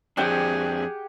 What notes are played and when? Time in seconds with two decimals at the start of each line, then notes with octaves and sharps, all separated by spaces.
0.17 F2 C4 D4 G4 G#4 F#5 G5